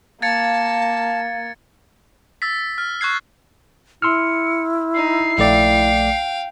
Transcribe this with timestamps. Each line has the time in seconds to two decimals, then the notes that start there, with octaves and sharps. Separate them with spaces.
0.22 A#3 F5 A5 G#6 A6 C#7
2.42 E6 A6 B6
2.78 F6
3.01 C#6 F#6 G#6 C7
4.02 E4 C6 E6 F6 C#7
4.94 D#4 C7
5.38 A#1 A3 D5 F5 G5